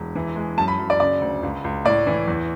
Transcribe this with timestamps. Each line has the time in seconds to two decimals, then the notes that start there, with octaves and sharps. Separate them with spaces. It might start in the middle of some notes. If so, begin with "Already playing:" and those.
Already playing: E1
0.16 E3
0.36 G#3
0.58 F#2 A5
0.68 B5
0.79 F#2
0.90 D5
1.00 C#3 D5
1.21 D2
1.43 C#2
1.64 C#2
1.85 A2 D5
2.07 E3
2.28 E2